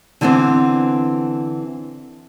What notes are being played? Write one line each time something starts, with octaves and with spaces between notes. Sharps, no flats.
D3 E3 G#3 B3 C4 D4